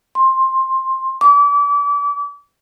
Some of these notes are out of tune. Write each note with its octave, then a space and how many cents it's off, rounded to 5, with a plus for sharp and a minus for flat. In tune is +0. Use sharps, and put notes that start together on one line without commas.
C6 +15
D6 -35